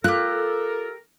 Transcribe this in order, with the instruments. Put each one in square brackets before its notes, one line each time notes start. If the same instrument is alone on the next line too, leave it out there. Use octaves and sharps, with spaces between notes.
[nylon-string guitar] F4 [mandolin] G4 F#6 [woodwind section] A4 A#4